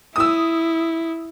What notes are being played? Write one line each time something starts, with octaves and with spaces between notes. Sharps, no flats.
E4 D#6 E6